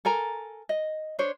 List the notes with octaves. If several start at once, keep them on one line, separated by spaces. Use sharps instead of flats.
A4 A#4 G#5 A#5
D#5
D4 C5 C#5